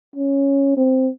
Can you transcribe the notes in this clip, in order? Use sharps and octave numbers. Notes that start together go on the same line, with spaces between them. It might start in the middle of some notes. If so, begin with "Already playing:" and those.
C#4
C4